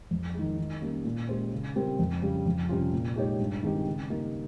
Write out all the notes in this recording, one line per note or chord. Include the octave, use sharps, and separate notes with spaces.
F2
D#3 G#3
D#3
G3 A#3 C#4
A#2
G#3 C#4 G4 C5
C#3
G3 C4 G4 A#4
F2
C#3 G3
F2
C3 G3 C#4 F4
A#2
G#3 D#4 G4 C#5
G2
D#3 G#3 C4 G4
C#3
G3 A#3 D#4